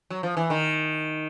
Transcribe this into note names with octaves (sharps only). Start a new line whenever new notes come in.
F#3
F3
E3
D#3